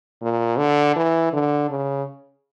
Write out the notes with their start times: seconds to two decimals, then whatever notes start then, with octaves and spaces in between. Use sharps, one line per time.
0.22 A#2
0.58 D3
0.96 E3
1.33 D3
1.70 C#3